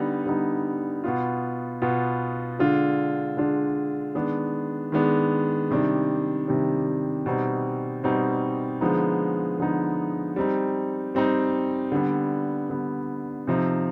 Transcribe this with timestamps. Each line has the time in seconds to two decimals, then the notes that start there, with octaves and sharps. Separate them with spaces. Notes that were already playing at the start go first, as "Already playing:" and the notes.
Already playing: D3 G3 B3 D#4
0.26 D3 G3 B3 D#4
1.04 B2 B3 F4
1.82 B2 B3 F4
2.59 D3 G#3 D4 F4
3.37 D3 G#3 D4 F4
4.15 D#3 G#3 B3 D4
4.92 D#3 G#3 B3 D4
5.71 C3 D#3 G3 D4
6.48 C3 D#3 G3 D4
7.26 B2 G3 C4 D#4
8.04 B2 G3 C4 D#4
8.81 D3 F3 G#3 B3 D#4
9.59 D3 F3 G#3 B3 D#4
10.36 G3 C4 D#4
11.15 G3 C4 D#4
11.92 D3 G3 B3
12.70 D3 G3 B3
13.47 C3 F3 C4 D#4